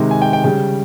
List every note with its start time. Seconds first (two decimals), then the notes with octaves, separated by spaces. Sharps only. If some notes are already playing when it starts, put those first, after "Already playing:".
Already playing: C3 D#3 G#3
0.11 G#5
0.22 G5
0.33 G5
0.44 C#3 G3 G5